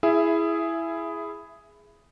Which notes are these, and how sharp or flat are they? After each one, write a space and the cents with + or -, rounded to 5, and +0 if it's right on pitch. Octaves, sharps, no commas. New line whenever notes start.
E4 +5 G#4 +0 E5 +25